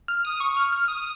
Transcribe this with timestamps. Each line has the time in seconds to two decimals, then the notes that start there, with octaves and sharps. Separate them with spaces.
0.08 F6
0.25 D#6
0.40 C#6
0.57 F6
0.73 F6
0.88 D#6